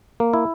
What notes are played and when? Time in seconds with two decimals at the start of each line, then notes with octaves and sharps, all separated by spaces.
0.20 A#3
0.33 E4